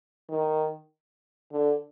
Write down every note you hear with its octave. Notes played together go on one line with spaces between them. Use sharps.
D#3
D3